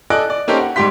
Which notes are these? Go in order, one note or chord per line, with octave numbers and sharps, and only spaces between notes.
A4 D5 D#5 G#5 F#6 D7
D5
A#3 C#4 D#4 G4 A4 C5
F#5
G#2 G3 G4 C6 B6